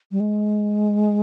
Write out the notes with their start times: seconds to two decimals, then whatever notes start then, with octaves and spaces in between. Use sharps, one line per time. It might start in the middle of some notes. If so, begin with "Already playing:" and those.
0.11 G3
0.20 G#3